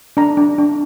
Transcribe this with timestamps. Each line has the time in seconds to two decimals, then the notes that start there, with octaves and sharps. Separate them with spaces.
0.17 D4 A#5
0.37 D4
0.58 D4